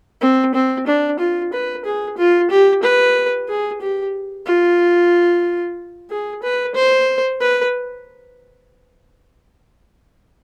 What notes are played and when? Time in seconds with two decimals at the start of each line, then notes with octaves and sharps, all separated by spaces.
0.21 C4
0.54 C4
0.86 D4
1.19 F4
1.53 B4
1.85 G#4
2.17 F4
2.50 G4
2.83 B4
3.48 G#4
3.81 G4
4.46 F4
6.10 G#4
6.42 B4
6.74 C5
7.40 B4